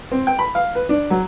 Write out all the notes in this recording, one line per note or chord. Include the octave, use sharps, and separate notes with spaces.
C4
G5
B5
F5
B4
D4
F#3